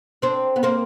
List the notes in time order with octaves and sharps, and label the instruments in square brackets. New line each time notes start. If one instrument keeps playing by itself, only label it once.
[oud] C4 D4
B3
A#3 C4